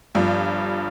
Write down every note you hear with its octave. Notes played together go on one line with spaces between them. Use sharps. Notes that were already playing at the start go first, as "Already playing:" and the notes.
G1 G2 F3